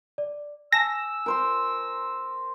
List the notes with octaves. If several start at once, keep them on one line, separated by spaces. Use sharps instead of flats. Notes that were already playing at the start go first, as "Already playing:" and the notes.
D5
G#5 A5 E6 A#6 E7
A#4 C5 C6